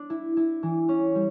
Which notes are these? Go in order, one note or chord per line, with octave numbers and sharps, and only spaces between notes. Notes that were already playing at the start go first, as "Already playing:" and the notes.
Already playing: D4
E4
E4
E3
C#4
G3